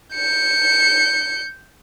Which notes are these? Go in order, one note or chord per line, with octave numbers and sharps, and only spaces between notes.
G6 C#7